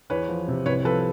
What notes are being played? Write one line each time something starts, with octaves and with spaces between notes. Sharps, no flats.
E2 B4 C#5
F3
C3
C2 B4 C#5
F3 A4 B4